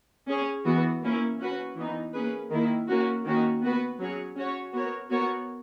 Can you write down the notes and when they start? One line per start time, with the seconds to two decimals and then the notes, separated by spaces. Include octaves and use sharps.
0.28 C#4 G#4 C#5
0.65 E3 B3 F#4
1.02 A#3 C#4 E4
1.39 C#4 F#4 B4
1.76 E3 B3 D#4
2.13 A#3 C#4 G#4 B4
2.50 D#3 A#3 E4
2.87 A#3 C#4 F#4
3.24 D#3 A#3 C#4 F#4
3.62 B3 F#4 B4
3.99 F#3 C#4 G#4 C#5
4.36 C#4 F#4 C#5
4.73 B3 F#4 A#4 C#5
5.10 B3 F#4 A#4 C#5